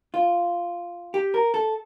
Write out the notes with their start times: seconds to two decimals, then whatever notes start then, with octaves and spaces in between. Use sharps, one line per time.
0.14 F4
1.14 G4
1.34 A#4
1.54 A4